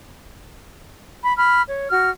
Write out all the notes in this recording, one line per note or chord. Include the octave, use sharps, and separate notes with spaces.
B5
B5 F6
C#5
F#4 F6